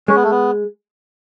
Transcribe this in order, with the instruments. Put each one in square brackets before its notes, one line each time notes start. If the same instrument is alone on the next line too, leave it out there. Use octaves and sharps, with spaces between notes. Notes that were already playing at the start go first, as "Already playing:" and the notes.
[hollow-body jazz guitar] G#3 [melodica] C#4
[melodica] B3
A3
B3